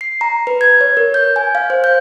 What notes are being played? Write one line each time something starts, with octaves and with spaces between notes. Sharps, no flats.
C7
A#5
B4
G#6
C#5
A#4
G6
G#5
F5
C5
G6